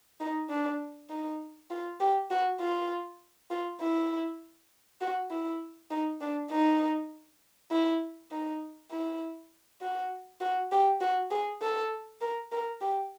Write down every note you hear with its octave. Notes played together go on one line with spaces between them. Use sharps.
D#4
D4
D#4
F4
G4
F#4
F4
F4
E4
F#4
E4
D#4
D4
D#4
E4
D#4
E4
F#4
F#4
G4
F#4
G#4
A4
A#4
A#4
G4